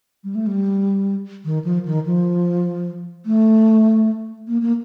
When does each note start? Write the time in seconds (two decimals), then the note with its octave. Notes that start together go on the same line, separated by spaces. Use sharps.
0.24 G3
0.35 A3
0.47 G3
1.45 D#3
1.65 F3
1.85 D#3
2.06 F3
3.26 A3
4.48 A#3
4.62 A#3